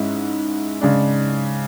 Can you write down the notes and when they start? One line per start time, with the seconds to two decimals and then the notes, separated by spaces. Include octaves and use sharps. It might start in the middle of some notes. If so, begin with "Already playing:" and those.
Already playing: G#2 G#3 C#4 E4
0.81 C#3 G#3 D4